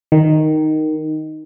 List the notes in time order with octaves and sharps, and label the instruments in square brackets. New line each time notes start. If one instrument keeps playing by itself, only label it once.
[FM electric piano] D#3